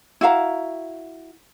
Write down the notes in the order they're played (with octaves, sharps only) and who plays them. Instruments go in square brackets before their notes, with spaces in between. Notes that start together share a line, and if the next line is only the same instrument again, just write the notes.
[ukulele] E4 F#4 F5 A#5